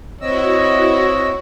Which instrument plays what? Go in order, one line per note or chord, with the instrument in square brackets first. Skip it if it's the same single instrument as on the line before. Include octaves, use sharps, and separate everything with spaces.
[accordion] C4 D#5 E6 [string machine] E4 F#4 [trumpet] C#5